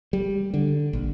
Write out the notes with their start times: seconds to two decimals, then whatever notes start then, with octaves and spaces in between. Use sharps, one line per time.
0.13 G3
0.54 D3
0.93 A#1